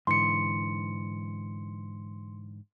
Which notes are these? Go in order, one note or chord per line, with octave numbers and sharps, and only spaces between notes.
G#2 D3 E3 C6 C#7